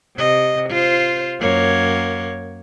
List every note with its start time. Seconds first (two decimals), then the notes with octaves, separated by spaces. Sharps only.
0.17 C3 D#5
0.70 F4 C5
1.40 F#2 A#3 C#5